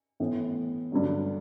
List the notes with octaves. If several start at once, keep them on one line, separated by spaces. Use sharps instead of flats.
A2 E3 B3
G2 D3 F#3